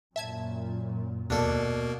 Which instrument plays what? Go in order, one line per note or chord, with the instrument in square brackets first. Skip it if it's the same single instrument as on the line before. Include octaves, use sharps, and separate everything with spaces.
[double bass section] F#2 A#2 [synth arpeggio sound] E5 A5 G#6
[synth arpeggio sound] D#2 [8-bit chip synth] B2 A#3 [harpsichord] D4 A4